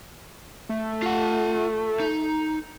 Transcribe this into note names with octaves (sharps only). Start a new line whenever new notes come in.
A3
F4 F#5
D#4